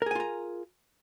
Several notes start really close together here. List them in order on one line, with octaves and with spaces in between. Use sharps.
A#4 G#4 G#5 F4 A#5